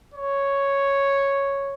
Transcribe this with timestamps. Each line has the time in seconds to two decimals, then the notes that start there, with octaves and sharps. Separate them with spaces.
0.14 C#5